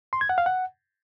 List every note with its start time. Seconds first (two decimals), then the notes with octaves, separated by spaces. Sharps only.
0.13 C6
0.21 G#6
0.29 F#5
0.38 F5
0.46 F#5